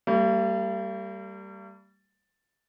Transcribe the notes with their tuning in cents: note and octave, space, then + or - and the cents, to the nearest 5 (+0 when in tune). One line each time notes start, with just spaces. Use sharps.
G3 -5 A#3 -45